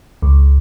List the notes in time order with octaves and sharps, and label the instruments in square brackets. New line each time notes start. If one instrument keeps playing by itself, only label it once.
[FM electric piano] C#2